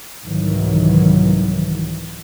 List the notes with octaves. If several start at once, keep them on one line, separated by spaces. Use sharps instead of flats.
C2 G#2 D#3 E3 F#3